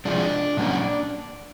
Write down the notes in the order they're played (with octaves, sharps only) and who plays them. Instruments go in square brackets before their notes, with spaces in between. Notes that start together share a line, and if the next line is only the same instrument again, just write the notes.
[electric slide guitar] C3 F3 G#3 D4
A#2 F#3 A#3 C#4